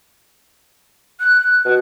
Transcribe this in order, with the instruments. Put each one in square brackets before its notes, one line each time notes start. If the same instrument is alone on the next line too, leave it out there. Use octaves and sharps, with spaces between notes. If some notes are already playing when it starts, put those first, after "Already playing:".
[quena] F#6
[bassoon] B2